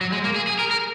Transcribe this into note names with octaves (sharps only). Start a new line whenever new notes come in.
F#3
G#3
A#3
G#4
G#4
A#4
A#4